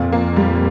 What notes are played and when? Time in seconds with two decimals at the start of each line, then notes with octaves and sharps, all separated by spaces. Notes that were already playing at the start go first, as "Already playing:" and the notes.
Already playing: F2 A#2
0.12 A#3
0.36 G3